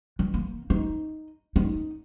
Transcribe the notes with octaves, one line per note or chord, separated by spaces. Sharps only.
E3
A#3
D#4
D#4